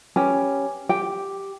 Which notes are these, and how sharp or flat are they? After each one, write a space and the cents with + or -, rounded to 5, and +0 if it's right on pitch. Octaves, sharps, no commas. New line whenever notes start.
C#4 +0 G4 +0 B4 +0
G4 +0 G5 +0